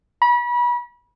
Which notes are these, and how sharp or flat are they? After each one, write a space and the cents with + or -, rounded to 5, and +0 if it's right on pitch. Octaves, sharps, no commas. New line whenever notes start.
B5 -35